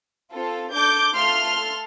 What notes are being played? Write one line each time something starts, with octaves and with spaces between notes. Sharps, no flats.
C4 F4 A4
D4 A4 D6 G6
A3 F4 A4 C6 F6
A4